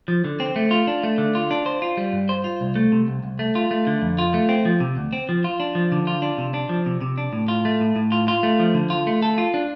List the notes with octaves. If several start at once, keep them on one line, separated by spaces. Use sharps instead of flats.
F3
D3
C4
A3
F4
D4
A3
D3
F4
D4
C5
F4
G3
G2
C5
F4
C2
A3
C3
C2
C2
A3
F4
A3
D3
F2
F4
A3
C4
F3
C3
D2
C4
F3
F4
D4
F3
D3
F4
D4
C3
D4
F3
C3
C3
D4
A2
F4
A3
A2
A2
F4
F4
A3
F3
D3
F4
A3
A4
F4
D4